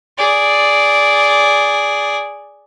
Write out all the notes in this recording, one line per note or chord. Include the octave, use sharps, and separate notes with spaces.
G#4 D5